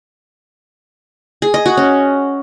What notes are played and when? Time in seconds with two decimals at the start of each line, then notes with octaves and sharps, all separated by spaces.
1.42 G#4
1.54 D#5
1.66 F#4
1.77 C#4